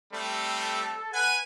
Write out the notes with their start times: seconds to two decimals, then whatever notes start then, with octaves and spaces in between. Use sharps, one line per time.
0.13 G3 A3 C4 A4
1.13 B4 F#5 G#5